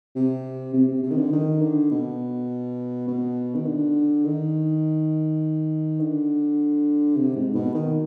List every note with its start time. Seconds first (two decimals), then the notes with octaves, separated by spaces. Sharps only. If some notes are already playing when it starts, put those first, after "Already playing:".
0.15 C3
0.74 C3
0.88 C3
1.03 C3
1.11 D#3
1.18 D3
1.32 D#3
1.62 D3
1.91 B2
3.08 B2
3.55 D#3
3.66 D3
4.25 D#3
6.00 D3
7.16 C3
7.36 G#2
7.55 B2
7.74 D#3